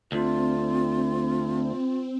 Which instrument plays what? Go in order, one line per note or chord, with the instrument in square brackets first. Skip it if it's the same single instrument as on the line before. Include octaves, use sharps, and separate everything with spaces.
[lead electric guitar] D2 [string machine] C4 [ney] F4